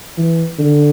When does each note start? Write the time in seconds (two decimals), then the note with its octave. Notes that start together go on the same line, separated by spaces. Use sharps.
0.18 E3
0.59 D3